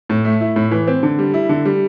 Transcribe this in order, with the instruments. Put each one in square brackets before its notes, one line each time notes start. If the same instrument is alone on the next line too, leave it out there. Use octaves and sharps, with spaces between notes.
[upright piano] A2
A3
E4
A2
E3
C4
D3
G3
E4
D3
G3